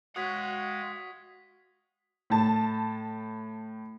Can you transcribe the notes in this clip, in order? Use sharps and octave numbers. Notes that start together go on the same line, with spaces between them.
G#3 F#4 C#5 F5 F#5 D#6 G#6 B6
A2 A5